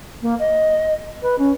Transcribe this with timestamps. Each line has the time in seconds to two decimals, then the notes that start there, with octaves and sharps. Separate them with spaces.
0.22 A#3
0.39 D#5
1.22 B4
1.39 C#4